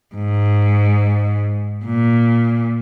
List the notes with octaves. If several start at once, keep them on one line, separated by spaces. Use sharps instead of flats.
G#2
A#2